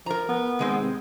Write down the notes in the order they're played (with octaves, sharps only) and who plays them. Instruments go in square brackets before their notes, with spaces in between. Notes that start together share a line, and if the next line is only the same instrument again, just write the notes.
[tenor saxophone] F3 [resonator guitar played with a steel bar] A#4 A#5
[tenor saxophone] B3
[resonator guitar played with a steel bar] D#3 G#3 C4
[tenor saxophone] C3